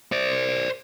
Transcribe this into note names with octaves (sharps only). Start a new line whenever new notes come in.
C5 D5